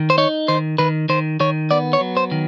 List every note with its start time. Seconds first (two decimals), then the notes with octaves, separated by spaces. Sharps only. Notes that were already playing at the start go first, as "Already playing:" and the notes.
Already playing: D#3
0.10 C5
0.18 D#4 C#5
0.48 D#3 C5
0.78 D#3 B4
1.09 D#3 C5
1.40 D#3 C#5
1.71 B3 D5
1.93 C#5
2.01 F#3
2.17 C5
2.32 D#3